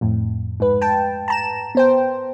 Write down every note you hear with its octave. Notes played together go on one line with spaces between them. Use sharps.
F2 A2
G#2 B4
G5 A5
A5 A#5 E7
B3 C5 G5